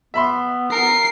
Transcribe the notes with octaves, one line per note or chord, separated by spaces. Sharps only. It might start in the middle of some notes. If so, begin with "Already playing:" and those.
B3 E5 B5 C6
A#4 C7